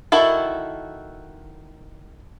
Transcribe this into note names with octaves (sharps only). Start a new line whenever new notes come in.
D#3 E4 F#4 A4